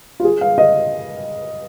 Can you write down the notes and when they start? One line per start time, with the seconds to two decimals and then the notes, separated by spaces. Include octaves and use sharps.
0.20 F4
0.24 G#4
0.41 F5
0.58 D#5